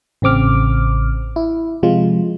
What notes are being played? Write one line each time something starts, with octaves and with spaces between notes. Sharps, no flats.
A1 C#3 C4 D6 F6
E4
C3 F3 G#3 F4